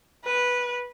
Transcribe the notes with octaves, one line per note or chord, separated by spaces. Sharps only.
B4